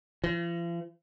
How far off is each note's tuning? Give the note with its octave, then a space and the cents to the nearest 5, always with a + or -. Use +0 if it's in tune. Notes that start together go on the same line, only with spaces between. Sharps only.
F3 -45